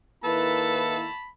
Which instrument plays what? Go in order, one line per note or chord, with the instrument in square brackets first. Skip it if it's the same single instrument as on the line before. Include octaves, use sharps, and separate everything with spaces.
[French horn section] D#3 A#3 E4 [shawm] A4 [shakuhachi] B4 [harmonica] A5 B5